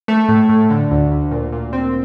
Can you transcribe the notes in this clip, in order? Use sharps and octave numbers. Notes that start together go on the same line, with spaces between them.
A3
A2
A2
D3
D2
D2
A#2
A#2
C4